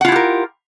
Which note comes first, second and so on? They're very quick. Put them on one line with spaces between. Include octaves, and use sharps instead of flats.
F#5 F4 E4 G4 A#4